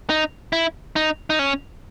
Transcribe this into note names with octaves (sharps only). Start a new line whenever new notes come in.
D#4
E4
D#4
D#4
C#4